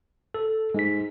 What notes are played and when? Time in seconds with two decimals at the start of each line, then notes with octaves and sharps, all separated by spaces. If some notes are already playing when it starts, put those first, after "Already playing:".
0.34 A4
0.74 G#2 G#3 B6